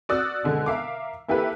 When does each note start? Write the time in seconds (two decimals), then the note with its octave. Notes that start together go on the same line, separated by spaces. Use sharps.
0.09 F#4 D5 D#6 E6 F#6
0.44 B2 D3 G#3
0.66 A#4 E5 F5 D6
1.28 A#3 E4 G4 A4 B4